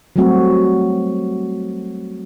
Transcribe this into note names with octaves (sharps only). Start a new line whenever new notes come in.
F#3 G3 A3 C4 F#4